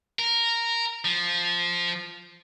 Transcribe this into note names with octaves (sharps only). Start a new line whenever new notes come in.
A#4
F3